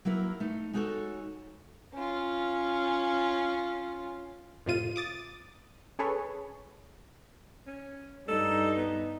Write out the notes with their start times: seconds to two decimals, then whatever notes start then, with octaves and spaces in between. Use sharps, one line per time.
0.05 F#3 A#3 E4 A#4
0.40 A3 D#4
0.73 G#3 D#4 F#4 G#4 A4 C#5
1.94 C#4 F4
4.66 F2 A2 C3 F4 D#7
4.96 D6 D#6 A6
5.99 C#4 G#4 A4 B4 C#5
7.67 C#4
8.28 G2 G3 D#4 A4
8.77 B3